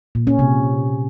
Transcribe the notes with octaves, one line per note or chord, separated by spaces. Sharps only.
A#2
C#4
C3